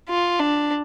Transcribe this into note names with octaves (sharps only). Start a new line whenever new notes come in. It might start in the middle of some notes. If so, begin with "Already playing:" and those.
F4
D4